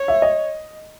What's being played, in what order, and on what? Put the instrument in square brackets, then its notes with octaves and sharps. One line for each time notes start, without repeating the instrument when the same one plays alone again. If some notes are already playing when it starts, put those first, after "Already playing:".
Already playing: [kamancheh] C#5
[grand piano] E5
D#5